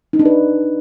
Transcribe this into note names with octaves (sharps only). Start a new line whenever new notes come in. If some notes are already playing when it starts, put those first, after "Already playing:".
D#4
D4
B4